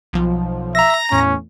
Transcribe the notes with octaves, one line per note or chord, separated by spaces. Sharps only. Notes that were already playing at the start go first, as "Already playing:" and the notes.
B1 F3
E5 A#5 A#6
E2 A2 C#4